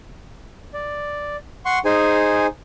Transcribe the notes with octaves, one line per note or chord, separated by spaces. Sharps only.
D5
F#5 C6 C#6
D#4 G#4 C5 G#5